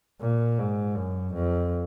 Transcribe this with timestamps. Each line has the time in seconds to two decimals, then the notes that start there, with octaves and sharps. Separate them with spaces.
0.21 A#2
0.59 G#2
0.97 F#2
1.34 F2